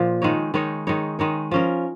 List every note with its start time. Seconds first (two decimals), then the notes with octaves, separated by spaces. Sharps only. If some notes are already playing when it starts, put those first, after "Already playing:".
Already playing: A#2 F3
0.22 D#3 G#3 D#4 C#5
0.54 D#3 G#3 D#4 C#5
0.87 D#3 G#3 D#4 C#5
1.19 D#3 G#3 D#4 C#5
1.51 F3 C#4 A#4